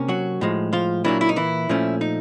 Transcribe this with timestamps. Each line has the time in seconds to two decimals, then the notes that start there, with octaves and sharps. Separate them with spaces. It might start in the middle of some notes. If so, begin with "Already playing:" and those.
Already playing: C3 A#3 C#4
0.08 F#3 F#4
0.41 A2 F3 G#3
0.73 F3 F4
1.04 A#2 E3 F#3 A#3 D4 E4
1.21 E4
1.29 D#4
1.36 E3 E4
1.69 A#2 F3 A3 C#4
2.01 D#4